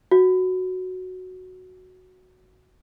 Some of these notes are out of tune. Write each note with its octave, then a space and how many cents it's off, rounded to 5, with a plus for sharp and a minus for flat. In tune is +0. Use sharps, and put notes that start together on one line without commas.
F#4 +0